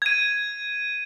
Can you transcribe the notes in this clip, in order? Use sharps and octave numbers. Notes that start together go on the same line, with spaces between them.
G#6 D#7